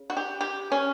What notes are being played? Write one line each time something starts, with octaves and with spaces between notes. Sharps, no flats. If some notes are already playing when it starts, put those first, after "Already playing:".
Already playing: C#3
F#4
G4
G4
C#4